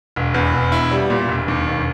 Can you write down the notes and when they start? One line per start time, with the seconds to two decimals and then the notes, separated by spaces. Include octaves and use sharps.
0.16 E1
0.34 E2
0.54 E1
0.72 E4
0.91 G3
1.10 A#2
1.29 E1
1.48 D#2
1.67 E1